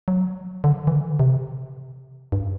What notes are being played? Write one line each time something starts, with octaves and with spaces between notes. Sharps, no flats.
F#3
D3
E3
D3
C3
G2